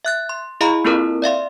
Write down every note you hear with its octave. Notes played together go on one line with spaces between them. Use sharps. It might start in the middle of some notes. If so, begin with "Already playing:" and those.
E5 F#6 A6
C6
E4 G#4 D#5 F5 A#5 B5
A#3 C4 E4 F4 A4 A#4
D5 E5 F5 C6